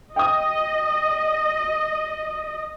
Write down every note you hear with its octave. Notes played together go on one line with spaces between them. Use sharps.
D#5 G5 D#6